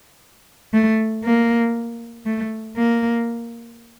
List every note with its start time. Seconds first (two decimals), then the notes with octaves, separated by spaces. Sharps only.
0.73 A3
1.24 A#3
2.26 A3
2.77 A#3